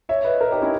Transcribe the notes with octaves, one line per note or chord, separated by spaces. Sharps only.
C#5 E5
B4 D#5
A#4 C#5
D#4 G4
C#4 E4